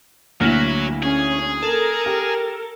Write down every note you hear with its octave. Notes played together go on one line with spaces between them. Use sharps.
D2 D3 F#3 A#3 E4 F#4
C#4 G#4
A4 A#4
G4